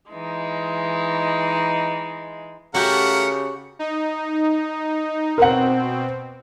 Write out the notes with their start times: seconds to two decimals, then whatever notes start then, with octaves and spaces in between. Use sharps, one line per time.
0.12 E3 G#3 D#4
2.75 C#3 A3 F#4 G4 A#4 F#5 C#7
3.79 D#4
5.38 B2 C4 A#4 F#5